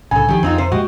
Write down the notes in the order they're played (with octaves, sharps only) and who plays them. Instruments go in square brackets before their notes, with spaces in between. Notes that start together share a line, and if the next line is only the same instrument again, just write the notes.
[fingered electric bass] C2 A2 [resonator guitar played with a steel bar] C#3 A4 [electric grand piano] G#5
[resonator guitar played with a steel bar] D#3 G4 [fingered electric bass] F3 F#3
[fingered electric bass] F2 [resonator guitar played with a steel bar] C4 D#4 F4
[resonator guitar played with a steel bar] C3 C5
[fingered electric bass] A#2 F#3 G#3 [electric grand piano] F#4 [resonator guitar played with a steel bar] G4 D#5